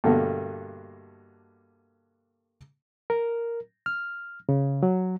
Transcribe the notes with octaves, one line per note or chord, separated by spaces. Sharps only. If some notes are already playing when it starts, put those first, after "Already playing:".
G2 B2 D3 A3 A#3
A#4
F6
C#3
F#3